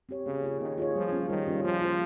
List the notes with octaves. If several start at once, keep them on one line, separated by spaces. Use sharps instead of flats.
C4 G4 C#5
C#3 A#3
F4 G#4 C#5
D#3 A#3
F4 G#4 C#5
F3 G3
C#4 F4
D#3 G3
C#4 F4
F3 A#3
F4 C5